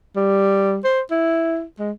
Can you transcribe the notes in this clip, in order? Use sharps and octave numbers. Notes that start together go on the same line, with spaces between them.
G3
C5
E4
G#3